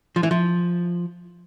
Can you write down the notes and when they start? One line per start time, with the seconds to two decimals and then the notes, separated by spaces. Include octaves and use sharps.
0.16 F3
0.23 E3
0.31 F3